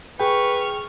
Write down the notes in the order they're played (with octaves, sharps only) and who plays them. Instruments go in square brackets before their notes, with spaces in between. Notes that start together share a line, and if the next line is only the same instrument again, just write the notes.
[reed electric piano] G#4 G5 [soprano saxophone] B4 [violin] C#6 F6